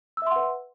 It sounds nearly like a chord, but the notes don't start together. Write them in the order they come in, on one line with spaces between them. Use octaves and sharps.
E6 E5 C6 F#5 B4